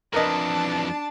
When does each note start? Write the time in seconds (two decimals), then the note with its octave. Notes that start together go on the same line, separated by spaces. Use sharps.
0.13 F2 E3 D4 A#4 B4 D#5 A5